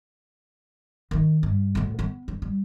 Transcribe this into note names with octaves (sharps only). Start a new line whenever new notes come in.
D#3 D#4
G2
A1 D2
B3
D4
G3